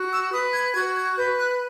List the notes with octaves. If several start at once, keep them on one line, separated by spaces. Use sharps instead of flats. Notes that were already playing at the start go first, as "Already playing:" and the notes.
Already playing: F#4
E6
B4 D#6
G#6
F#4 G#6
G#6
F#6
B4 G6
F#6